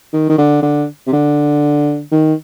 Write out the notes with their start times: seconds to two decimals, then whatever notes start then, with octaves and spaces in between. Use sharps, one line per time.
0.13 D#3
0.29 D#3
0.38 D3
0.62 D3
1.07 C3
1.13 D3
2.11 D#3